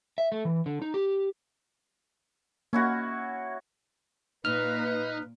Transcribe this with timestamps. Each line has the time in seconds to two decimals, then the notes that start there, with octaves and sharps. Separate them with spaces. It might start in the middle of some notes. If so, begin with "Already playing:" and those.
0.18 E5
0.32 A3
0.45 E3
0.66 D3
0.82 D#4
0.94 G4
2.73 A#3 C#4 E4 F#4
4.45 A#2 A#3 D#4 B4 F6